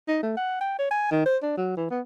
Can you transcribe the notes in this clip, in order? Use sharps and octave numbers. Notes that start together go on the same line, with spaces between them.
D#4
A3
F#5
G5
C#5
G#5
D#3
C5
D4
F#3
E3
B3